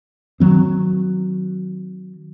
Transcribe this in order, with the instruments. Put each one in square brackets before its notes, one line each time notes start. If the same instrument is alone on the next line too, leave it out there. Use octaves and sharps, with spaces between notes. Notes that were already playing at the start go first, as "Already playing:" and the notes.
[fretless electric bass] D#3 F#3 C4